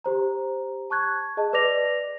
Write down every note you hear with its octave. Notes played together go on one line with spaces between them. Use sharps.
G4 C5 A#5
A5 C#6 F#6 G#6
G#4 D#5 A5
B4 D5 D6 A#6 F7